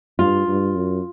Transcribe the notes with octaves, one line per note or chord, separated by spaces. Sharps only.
G2 F4
G2
F#2